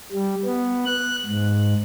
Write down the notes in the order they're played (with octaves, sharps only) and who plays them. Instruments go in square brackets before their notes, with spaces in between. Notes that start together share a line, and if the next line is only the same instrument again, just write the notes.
[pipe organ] G3
B3
F#6
G#2